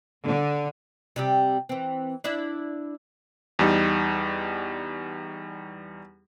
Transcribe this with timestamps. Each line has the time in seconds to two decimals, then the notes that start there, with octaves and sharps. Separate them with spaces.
0.25 D3
1.16 C3 G3 G4
1.69 E3 C4
2.24 D4 E4 E5
3.59 E2 G3 D#4